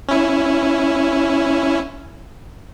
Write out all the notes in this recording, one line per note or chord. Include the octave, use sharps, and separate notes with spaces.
C#4 E4